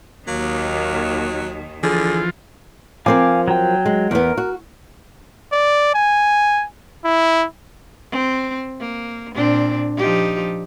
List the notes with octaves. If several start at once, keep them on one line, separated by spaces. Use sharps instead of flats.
D#2 D#3 F#3 A#3
D3 E3 F3 F4 G#4
F3 C4 A#4 F5 G#5 D6
F#3 G5
G#3
E2 B3 A#4
F#4
D5
G#5
E4
C4
A#3
A#2 C4 D4
F3 D#4 G4